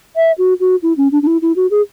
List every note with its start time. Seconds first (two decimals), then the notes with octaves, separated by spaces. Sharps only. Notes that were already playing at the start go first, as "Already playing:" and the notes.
0.16 E5
0.38 F#4
0.60 F#4
0.82 E4
0.97 C#4
1.12 D4
1.22 D4
1.27 E4
1.42 E4
1.56 F#4
1.71 G#4